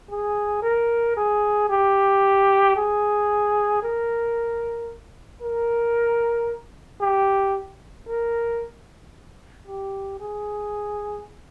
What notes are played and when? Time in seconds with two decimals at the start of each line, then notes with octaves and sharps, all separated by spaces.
0.10 G#4
0.63 A#4
1.17 G#4
1.70 G4
2.76 G#4
3.83 A#4
5.42 A#4
7.01 G4
8.08 A#4
9.67 G4
10.20 G#4